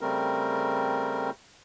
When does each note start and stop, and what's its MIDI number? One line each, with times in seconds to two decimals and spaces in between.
0.01 1.30 49
0.01 1.30 55
0.01 1.30 57
0.01 1.30 60
0.01 1.30 70